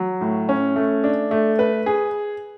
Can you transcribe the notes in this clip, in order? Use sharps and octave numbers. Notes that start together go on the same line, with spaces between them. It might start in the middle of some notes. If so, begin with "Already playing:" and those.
Already playing: F#3
A2
C#4
A3
D4
A3
B4
G#4